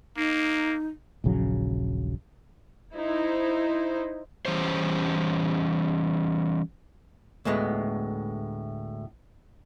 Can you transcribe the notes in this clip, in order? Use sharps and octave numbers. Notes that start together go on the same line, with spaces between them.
A#3 D#4
D#1 A#1 C#3 F#3
D#4 E4 C5
E3 G3 C#4 C5
D2 A2 G#3 B3